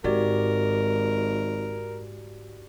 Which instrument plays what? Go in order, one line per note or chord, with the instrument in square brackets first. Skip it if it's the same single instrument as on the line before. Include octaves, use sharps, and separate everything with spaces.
[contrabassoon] G#1 [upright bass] G#2 [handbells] F#4 G4 D5 [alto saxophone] A#4